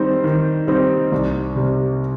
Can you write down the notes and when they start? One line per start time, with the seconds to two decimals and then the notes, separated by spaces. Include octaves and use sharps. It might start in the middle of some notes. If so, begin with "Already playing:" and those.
Already playing: D#3 G3 C4 D#4 C5
0.24 D#3
0.67 G3 C4 D#4 C5
1.12 C2
1.55 C3 G3